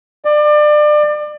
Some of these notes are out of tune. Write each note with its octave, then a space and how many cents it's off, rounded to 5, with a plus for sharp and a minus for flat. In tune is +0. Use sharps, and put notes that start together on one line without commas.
D5 +30